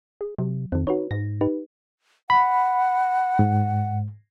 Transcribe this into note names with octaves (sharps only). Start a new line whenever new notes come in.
G#4
C3 F#3
F2 D#3 C4
D#4 F#4 B4 C#5
G#2 A#6
D#4 G4 B4
F#5 B5
G#2